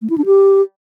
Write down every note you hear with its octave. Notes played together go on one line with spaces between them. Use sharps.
A3
E4
D4
G4